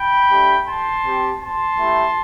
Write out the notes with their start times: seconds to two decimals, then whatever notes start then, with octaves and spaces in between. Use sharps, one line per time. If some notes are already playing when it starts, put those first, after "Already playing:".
Already playing: G5 B5
0.30 A3 D4 G4
0.67 A5 C6
1.05 C4 G4
1.42 A5 C6
1.79 A3 E4 G4